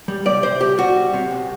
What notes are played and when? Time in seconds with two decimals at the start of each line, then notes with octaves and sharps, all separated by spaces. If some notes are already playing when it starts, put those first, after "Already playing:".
0.08 G3
0.25 C2 D5
0.43 C3 C5
0.60 C2 G4
0.78 G3 F#4
0.96 C2
1.13 C3
1.31 C2